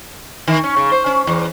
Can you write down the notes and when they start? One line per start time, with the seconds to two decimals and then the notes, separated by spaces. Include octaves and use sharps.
0.48 D#3
0.64 C#4
0.77 C#3
0.92 C5
1.06 C#4
1.27 E2